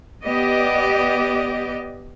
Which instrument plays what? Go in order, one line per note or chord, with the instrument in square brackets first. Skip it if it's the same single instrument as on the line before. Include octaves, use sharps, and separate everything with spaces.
[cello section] B3 G4 D5 D#5